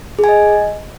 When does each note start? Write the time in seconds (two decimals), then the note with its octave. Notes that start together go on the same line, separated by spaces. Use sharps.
0.19 G#4
0.24 G#5
0.29 D#5